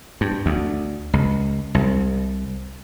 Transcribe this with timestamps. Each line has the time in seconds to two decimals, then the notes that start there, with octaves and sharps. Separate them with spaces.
0.21 G2
0.46 D2
1.13 C#2
1.75 C2